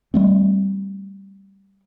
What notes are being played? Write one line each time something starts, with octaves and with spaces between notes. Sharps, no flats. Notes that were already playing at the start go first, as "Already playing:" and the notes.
G3 A3 C4